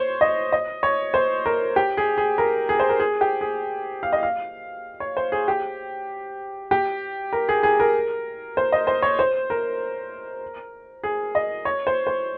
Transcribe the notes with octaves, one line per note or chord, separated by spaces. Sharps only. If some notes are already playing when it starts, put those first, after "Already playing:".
Already playing: C5 C#5
D#5
D#5
C#5
C5
A#4
G4
G#4
G#4
A#4
G#4
C5
A#4
G#4
G4
G#4
F5
D#5
F5
C#5
C5
G#4
G4
G4
A#4
G#4
G#4
A#4
C5
D#5
C5
C#5
C5
A#4
G#4
D#5
C#5
C5
C5